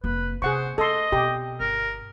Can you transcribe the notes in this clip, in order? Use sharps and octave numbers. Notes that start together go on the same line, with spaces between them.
F1 A#3 B4
C3 G#4 C5 F#5 C#6
A3 A4 D#5 C6
B2 G4
G1 A#4